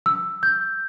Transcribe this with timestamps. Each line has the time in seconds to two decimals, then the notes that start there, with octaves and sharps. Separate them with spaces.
0.06 E6
0.43 G6